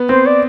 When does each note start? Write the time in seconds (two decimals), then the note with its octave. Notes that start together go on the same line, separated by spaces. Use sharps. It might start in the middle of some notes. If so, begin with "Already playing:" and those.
Already playing: B3
0.09 C4 C5
0.26 D5